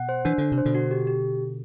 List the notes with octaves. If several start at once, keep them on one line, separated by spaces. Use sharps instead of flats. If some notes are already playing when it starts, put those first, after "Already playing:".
Already playing: B2 F#5
C5
E3 D4
D3 D4
C3
C5
B2 D3
F#4
G4
G4